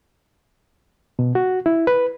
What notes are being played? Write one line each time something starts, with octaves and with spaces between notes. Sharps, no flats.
B2
F#4
E4
B4